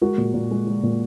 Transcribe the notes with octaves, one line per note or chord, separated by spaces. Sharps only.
G#3 F#4 A#4
A#2
A#2
G#3
G#3
A#2